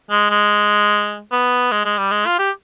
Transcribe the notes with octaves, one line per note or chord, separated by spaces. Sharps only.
G#3
G#3
B3
G#3
G#3
G3
G#3
F4
G4